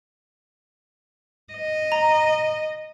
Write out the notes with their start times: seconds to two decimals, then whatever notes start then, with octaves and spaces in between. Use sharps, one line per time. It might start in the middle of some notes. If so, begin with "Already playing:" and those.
1.54 D#5
1.92 A#5